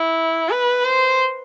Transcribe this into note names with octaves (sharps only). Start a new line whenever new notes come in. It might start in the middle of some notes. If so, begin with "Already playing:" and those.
Already playing: E4
B4
C5